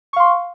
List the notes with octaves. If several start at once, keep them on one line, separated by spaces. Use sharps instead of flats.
F5 C6 C#6